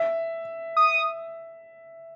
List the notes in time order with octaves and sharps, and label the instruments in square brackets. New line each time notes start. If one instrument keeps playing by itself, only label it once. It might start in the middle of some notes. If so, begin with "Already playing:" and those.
Already playing: [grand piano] E5
[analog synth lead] D#6